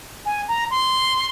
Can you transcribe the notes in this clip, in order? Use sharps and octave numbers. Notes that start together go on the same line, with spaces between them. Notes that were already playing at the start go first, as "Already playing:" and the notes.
G#5
A#5
C6